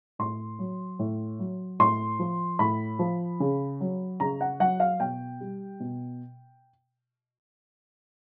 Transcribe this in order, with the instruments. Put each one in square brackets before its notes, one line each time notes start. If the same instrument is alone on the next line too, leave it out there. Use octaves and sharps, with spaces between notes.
[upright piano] A2 C6
F#3
A2
F#3
A2 C6
F3
A2 B5
F3
C#3
F#3
C#3 A#5
F#5
F#3 F#5
F5
B2 G5
G3
B2